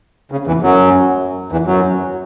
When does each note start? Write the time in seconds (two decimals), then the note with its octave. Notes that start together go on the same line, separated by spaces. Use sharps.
0.32 C#3
0.47 E2 E3
0.62 F#2 F#3
1.52 E2 E3
1.67 F#2 F#3